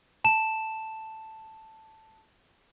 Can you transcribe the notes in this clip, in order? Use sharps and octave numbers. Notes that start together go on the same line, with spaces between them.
A5 E7